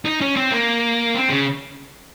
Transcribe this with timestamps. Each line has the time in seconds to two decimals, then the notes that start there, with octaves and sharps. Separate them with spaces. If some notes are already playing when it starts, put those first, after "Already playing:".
0.05 D#4
0.21 C#4
0.36 C4
0.51 A#3
1.14 C4
1.30 C#3